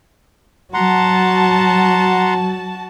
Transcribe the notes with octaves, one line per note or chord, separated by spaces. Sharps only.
F#3 F#4 F#5 A5 A#5 C6